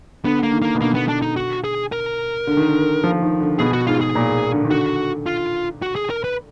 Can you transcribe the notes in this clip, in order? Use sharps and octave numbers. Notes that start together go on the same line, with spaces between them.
D3 B3
A#3
D#3
A#3
B2
D3 A#3
B3
D4
D#4
F#4
G#4
A#4
D3
D#3
D3
F3
D#3
D3
B2 G#4
F#4
G#2 F4
G#4
A#2
D3
D#3
D3 F#4
F4
F#4
G#4
A#4
B4